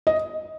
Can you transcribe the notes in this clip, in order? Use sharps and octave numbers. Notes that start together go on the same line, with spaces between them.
D#5